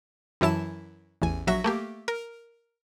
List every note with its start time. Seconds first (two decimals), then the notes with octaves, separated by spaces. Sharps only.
0.41 F#2 E3 F#3 E4 A5 E7
1.22 A1 E2 G#5
1.47 A#1 F#3 F#4 E5 A#6
1.64 A3 A#3 G4
2.08 A#4